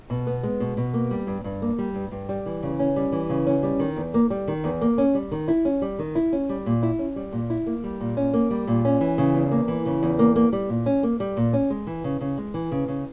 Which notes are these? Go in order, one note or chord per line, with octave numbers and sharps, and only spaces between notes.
B2
B3
G#3
B2
B2
A#3
G3
G2
G2
A#3
G3
G2
G2
G3
E3
C#3
C#4
G3
E3
C#3
C#4
G3
D#3
E2
A#3
G3
D#3
E2
A#3
C#4
G3
D#3
E4
C#4
G3
D#3
E4
C#4
G3
A#2
E4
C#4
G3
A#2
E4
A#3
G3
A#2
C#4
A#3
G3
A#2
C#4
E3
C#3
E2
A#3
E3
C#3
E2
A#3
A#3
G3
A#2
C#4
A#3
G3
A#2
C#4
G#3
E3
C#3
C#3
G#3
E3
C#3
C#3